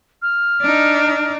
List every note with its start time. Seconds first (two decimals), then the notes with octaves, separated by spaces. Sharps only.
0.22 F6
0.62 D4 D#4